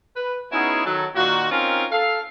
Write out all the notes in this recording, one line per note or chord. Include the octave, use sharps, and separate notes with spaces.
B4
B3 C#4 D#4 E4 F#4 G#4
D#3 F#3 A4
A#2 D#3 F4 F#4
C4 C#4 D#4 F4 A#4
A4 F5